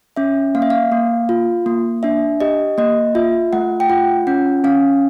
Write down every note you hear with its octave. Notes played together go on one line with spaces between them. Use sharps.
C#4 E5
A#3 F5
E5
F5
A#3
F4
A#3
D4 E5
G4 D#5
A#3 D#5
F4 E5
A3 F#5
G5
F4 F#5
C#4 F#5
C#4 F5